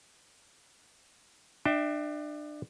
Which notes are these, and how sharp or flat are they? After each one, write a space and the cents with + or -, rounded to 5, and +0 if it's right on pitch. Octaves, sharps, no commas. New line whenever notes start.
D4 +30 E5 +0 G5 +0